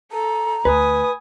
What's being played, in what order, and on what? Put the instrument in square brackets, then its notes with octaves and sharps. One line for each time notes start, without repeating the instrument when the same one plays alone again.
[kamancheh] A4 [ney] A#5
[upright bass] D2 E4 [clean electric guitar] B4 [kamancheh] G#5 D#6